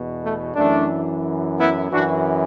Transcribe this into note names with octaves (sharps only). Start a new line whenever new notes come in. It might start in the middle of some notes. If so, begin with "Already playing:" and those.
Already playing: E2 B2
A3
F#2 E3 A3 D4
B3 E4
F#2 E3 D4 F#4